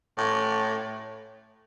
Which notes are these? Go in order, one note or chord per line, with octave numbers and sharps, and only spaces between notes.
A2